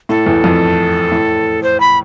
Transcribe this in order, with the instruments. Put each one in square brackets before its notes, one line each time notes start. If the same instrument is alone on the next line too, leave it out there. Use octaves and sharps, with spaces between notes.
[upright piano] A2 [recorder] A4
[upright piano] E2
F2
A2
[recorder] C5
B5